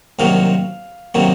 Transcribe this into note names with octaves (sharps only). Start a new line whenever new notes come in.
C2 C3 D#3 F#3 A#3 F5
C3 D#3 F#3 A#3